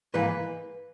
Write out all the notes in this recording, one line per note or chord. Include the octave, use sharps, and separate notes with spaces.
G#2 E3 A#3 B4